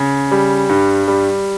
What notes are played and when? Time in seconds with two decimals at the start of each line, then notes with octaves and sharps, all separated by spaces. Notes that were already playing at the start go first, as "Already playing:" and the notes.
Already playing: C#3
0.31 G3
0.69 G2
1.08 G3